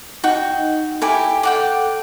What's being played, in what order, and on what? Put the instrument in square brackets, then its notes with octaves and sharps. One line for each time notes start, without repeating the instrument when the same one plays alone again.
[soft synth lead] D#4 [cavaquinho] F#4 G5
[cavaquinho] E4 G4 G#5 [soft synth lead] A4
[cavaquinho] D5 F#5 G5